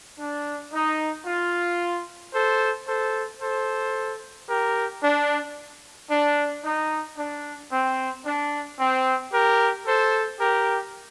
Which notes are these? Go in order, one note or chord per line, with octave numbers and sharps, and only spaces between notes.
D4
D#4
F4
A4 C5
A4 C5
A4 C5
G4 A#4
D4
D4
D#4
D4
C4
D4
C4
G4 A#4
A4 C5
G4 A#4